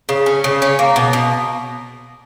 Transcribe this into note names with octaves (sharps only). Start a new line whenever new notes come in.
C#3
C#4
C#3
C#4
A#3
B2
B2